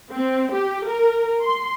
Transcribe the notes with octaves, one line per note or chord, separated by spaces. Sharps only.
C4
G4
A#4
C6